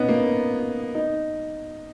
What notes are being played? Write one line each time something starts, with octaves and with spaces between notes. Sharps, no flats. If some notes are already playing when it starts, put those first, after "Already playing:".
Already playing: B3 C#4 D#4
A#3
D#4